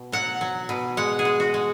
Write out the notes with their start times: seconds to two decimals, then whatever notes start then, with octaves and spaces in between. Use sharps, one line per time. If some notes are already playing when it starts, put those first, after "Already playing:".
Already playing: B2
0.12 F#3 F#5
0.41 F#3
0.69 B2
0.97 G#3 F#5
1.19 G#4
1.25 G#3
1.40 F#4
1.54 G#3